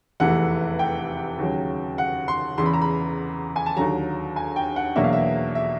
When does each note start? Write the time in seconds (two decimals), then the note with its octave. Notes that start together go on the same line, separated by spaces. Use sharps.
0.20 F1 E2 C3 E3 A3 F#5
0.79 G5
1.39 D#2 C#3 F#3
1.98 F#5
2.28 C6
2.58 E2 C#3 E3 C6
2.66 B5
2.73 A#5
2.82 B5
3.56 G#5
3.66 A5
3.76 D#2 D3 F#3 A#5
4.36 G#5
4.56 G5
4.76 F#5
4.95 E2 B2 F#3 A#3 D4 E5
5.04 F5
5.13 E5
5.55 E5